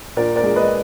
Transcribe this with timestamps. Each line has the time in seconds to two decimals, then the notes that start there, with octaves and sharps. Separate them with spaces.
0.17 A#2 A#4 D5
0.36 A#4 D5
0.43 G#3
0.56 B4 D#5